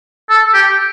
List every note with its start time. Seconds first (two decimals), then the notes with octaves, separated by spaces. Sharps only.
0.30 A4
0.54 G4